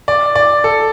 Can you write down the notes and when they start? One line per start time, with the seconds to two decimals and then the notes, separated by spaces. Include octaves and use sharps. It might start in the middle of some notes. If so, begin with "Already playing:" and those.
0.08 D5
0.35 D5
0.64 A4